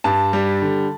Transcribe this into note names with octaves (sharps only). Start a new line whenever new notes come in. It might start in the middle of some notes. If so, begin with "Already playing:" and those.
G2 A5
G3
D3